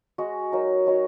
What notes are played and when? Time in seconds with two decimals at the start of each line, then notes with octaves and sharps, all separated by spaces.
0.18 G#3 F#4 D#5
0.52 F#3 D#4 A#4
0.86 F#3 D#4 F#4 C#5